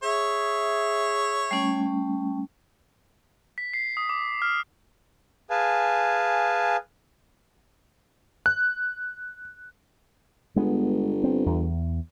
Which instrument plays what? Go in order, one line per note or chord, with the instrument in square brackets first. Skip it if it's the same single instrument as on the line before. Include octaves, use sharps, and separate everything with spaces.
[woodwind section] G#4 E5 [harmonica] C#5
[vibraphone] G3 A3 C#4
[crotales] B6
C7
D#6
D6
F6
[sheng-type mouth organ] G#4 B4 F5 G#5 A5
[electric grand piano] F#6
[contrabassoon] G1 [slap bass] G#3 B3
[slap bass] C4
E2